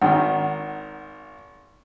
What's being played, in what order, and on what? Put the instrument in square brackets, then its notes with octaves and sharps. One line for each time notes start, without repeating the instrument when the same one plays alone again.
[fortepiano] G#1 D#3 [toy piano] F#5